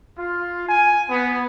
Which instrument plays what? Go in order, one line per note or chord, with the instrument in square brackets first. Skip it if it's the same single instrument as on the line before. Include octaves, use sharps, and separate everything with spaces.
[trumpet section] F4
G#5
B3